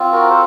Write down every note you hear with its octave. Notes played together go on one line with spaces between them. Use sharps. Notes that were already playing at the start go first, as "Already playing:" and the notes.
Already playing: C4 F4
F#4 A#4
A4 C5